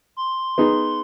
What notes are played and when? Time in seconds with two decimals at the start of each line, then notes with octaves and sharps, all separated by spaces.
0.17 C6
0.58 B3 D#4 G#4